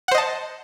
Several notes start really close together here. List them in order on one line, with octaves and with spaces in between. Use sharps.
F#5 C5 D#5 A5